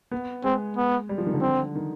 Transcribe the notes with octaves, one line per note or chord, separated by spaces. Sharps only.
B3
G#3 C4
B3
G3
F3
D#3
D3
C4
D#3